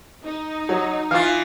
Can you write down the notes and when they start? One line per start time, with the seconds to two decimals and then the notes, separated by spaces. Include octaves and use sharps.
0.24 D#4
0.69 F#3
1.11 E3 F4 F5